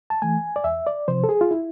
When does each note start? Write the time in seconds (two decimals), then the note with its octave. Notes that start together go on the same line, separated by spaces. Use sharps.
0.10 A5
0.22 E3 A3 G#5
0.56 D5
0.64 E2 E5
0.87 D5
1.08 C3 F3 C5
1.24 A4
1.29 G#4
1.41 F4
1.51 E4